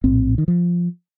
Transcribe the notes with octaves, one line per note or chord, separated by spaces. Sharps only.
A#1 A2 C4
D#3
F3